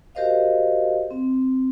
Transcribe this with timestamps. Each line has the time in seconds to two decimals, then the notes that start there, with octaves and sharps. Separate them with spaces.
0.15 F#4 G4 A#4 C5 D#5 F5
1.11 C4